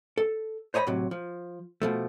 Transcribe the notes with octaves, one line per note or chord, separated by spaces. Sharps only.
A4
C5 C#5 D#5 A5 B5
A2 C3 F#3
F3
B2 F3 A3